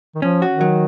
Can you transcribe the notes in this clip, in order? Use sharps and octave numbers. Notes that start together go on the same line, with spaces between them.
D#3
F3 C#4
F#4
D#3
F#3